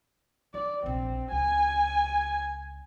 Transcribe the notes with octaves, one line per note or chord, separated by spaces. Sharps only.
D#3 D5
E1 A#1 C4
C#2 G#5